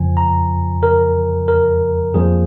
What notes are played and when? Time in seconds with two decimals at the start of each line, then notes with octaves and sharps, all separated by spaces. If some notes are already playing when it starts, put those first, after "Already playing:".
Already playing: F2 C#3 F3 G#5
0.17 A#5
0.83 A#4
1.48 A#4
2.14 F2 F3 A#3 G#4